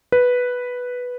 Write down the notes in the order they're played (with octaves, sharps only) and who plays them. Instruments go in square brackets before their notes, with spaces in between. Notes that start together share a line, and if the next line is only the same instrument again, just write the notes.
[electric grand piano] B4